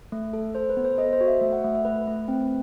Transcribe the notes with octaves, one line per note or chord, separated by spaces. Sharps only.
A3
A4
A4 C5
B4
B3
C5
A4 D#5
C5
F#4
E5
A3 E5
F#5
A3 E5
E5
A3 B4
A3
C4